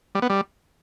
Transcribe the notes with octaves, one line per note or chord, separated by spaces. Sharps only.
G3
B3
G3